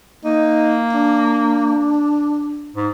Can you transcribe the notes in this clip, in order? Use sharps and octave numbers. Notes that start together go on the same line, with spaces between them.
A#3 D#4
D4
G#2